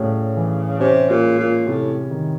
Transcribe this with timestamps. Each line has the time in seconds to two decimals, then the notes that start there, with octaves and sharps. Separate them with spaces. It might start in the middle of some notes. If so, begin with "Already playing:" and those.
Already playing: A2 C#3 G3
0.37 E3
0.80 C3 C#4
1.10 A#2
1.24 G#3
1.39 A#2
1.67 A2 C3
2.11 D#3